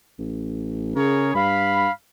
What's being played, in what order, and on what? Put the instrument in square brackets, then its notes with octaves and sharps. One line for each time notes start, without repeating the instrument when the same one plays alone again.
[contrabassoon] A1
[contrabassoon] C#3 [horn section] G#4 A#4 C#5
[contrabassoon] G2 [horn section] F5 B5